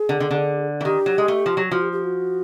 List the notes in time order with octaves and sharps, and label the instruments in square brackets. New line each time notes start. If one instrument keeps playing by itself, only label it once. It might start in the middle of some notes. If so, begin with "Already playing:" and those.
Already playing: [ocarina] G#4
[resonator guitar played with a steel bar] D3
D3
D3
E3
[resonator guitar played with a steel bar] D#3 [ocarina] G4
[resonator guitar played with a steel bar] F#3
G#3
A3
F3
F#3
[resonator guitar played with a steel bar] F3 [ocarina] F#4
[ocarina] G4
G4
F#4